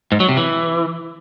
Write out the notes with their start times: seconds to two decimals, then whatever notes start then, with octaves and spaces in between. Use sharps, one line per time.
0.12 G#2
0.20 F#3
0.29 C3
0.37 E3